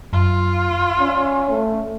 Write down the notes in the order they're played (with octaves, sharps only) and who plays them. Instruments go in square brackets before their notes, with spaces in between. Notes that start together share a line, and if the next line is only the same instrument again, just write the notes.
[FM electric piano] F#2 [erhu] F4
[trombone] C#4 [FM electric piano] D5
[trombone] A3